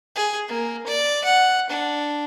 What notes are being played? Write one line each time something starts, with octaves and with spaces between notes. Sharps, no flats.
G#4
A#3
D5
F#5
D4